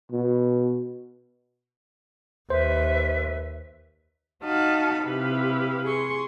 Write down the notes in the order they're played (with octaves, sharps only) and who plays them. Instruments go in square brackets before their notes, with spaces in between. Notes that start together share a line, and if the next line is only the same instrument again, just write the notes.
[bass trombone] B2
[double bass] D#2 [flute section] B4 E5 [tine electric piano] C5
[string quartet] D#4 F#4 D#5 F5 A5 B5
C3 E4 G4 B4 F5
G#4 C6 C#6